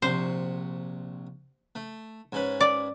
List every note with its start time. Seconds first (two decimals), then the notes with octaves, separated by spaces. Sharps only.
0.02 A#1 C3 C5 C#6
1.75 A3
2.32 G#2 C#4 B4
2.61 D5